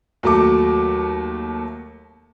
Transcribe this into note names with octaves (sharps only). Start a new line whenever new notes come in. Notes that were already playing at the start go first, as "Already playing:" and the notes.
D#2 F#3 A3 A5 D6